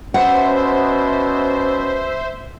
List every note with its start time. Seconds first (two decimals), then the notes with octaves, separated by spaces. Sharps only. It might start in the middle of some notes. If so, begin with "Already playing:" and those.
0.14 B2 C#4 C5 E5 F#5